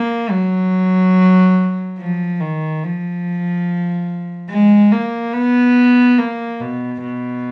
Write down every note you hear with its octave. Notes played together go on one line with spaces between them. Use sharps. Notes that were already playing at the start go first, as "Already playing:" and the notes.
Already playing: A#3
F#3
F3
D#3
F3
G#3
A#3
B3
A#3
B2
B2